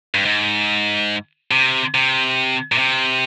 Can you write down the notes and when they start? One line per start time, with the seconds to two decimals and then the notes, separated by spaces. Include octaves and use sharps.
0.14 G2
0.25 G#2
1.51 C3
1.94 C3
2.72 A#2
2.78 C3